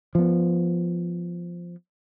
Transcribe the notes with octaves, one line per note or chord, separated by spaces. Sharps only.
F3 B3